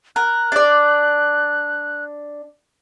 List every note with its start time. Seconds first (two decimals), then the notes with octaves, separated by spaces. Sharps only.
0.16 A#4 F#6
0.52 D4 D5